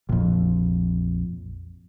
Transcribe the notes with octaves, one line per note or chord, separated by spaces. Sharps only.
A#1 F2